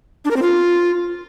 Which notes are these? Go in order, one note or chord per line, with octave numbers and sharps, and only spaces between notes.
D4
A#4
C4
F4